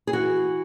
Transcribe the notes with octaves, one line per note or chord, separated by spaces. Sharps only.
G#4
E3 F#4